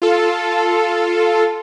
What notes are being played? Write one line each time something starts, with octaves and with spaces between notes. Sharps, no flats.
F4 A4